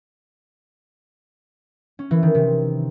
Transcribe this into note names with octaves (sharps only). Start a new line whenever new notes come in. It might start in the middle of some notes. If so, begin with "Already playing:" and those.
C#4
E3
D#3
C3